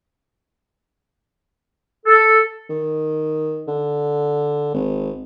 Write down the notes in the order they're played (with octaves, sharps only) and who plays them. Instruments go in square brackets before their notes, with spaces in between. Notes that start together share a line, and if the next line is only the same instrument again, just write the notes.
[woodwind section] A4
[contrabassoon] D#3
D3
G#1